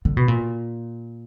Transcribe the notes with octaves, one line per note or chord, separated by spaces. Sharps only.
D3
B2
A#2